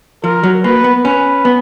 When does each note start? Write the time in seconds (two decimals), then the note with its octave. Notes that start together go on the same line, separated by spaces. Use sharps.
0.24 F3 A#4
0.43 F#3
0.64 A#3 B4
0.84 B3
1.05 C#4 B4
1.45 B3